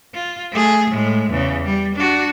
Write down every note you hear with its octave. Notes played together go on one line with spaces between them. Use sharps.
F4
A3 G#4
A2 G#3
E2 C#3
G3
D4 F#4